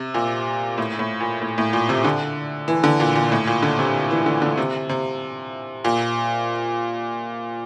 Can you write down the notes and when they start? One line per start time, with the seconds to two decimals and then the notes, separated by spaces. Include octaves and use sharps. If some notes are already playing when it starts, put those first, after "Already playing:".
Already playing: C3
0.14 A#2
0.78 A2
0.99 A2
1.20 A#2
1.41 A2
1.58 A2
1.73 A#2
1.89 C3
2.04 D3
2.68 E3
2.84 D3
3.00 A#2
3.15 A#2
3.32 A2
3.47 A#2
3.63 D3
3.79 C3
4.11 E3
4.26 D3
4.42 D3
4.57 C3
4.89 C3
5.85 A#2